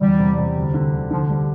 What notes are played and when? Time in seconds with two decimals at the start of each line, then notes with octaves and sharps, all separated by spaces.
0.01 E2 G3
0.19 C3
0.38 C3
0.56 D2
0.74 D3
0.93 D2
1.11 D3 F3
1.30 G3